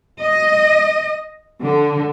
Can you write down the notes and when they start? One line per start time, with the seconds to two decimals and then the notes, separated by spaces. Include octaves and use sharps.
0.21 D#5
1.61 D3